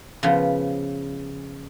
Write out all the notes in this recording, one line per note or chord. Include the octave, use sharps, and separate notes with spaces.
C#3 F3 B3